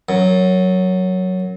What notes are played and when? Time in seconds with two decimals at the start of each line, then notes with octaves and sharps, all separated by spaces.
0.09 F#2